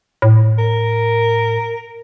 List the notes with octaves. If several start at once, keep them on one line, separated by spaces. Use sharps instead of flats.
A2
A#4